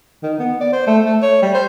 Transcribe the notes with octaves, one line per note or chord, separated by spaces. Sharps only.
D#3
B3
D5
C5
A3
A3
C#5
G3
C5